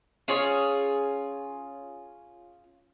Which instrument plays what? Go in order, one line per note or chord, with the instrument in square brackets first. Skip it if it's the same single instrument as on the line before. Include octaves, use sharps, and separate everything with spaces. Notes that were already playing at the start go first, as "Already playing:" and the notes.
[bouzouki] C#4 F4 G#4 C#5